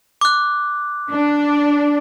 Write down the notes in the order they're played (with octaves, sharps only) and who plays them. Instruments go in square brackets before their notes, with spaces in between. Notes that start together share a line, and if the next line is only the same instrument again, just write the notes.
[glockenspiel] D6 F#6
[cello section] D4